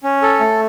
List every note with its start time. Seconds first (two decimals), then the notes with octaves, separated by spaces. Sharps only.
0.03 C#4
0.22 A4
0.40 A3